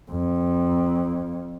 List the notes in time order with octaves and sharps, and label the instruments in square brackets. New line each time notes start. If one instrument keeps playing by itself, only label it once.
[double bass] F2